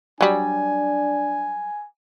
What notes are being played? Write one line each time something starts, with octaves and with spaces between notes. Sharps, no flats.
F#3 G3 D4 G#5